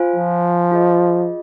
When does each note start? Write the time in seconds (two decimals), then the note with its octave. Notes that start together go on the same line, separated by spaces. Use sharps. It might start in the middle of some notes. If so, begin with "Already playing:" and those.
Already playing: F4 C5 F5 G#5
0.16 F3
0.71 F4 G#4 D#5